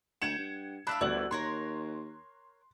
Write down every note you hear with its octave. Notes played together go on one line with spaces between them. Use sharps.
D2 F#5 G5 G#6 C#7 E7
G2
D4 E5 F5 B5 F#6
G1 D2 E4 D5 F#7
D#2 A#4 C#5 C6 C#6